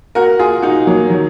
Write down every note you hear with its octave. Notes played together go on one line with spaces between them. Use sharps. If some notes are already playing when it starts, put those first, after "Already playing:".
F#4 A#4
F4 G#4
D#4 F#4
F#3 A#3
D#3 F#3